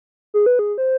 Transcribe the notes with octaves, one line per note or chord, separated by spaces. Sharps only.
G#4
B4
G#4
C5